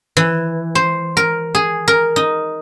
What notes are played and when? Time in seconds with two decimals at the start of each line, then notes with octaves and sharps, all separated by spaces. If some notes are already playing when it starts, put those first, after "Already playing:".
0.17 E3
0.75 C5
1.17 A#4
1.55 G#4
1.88 A#4
2.16 D#4